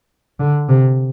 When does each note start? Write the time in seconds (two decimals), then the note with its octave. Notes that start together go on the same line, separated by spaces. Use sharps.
0.40 D3
0.69 C3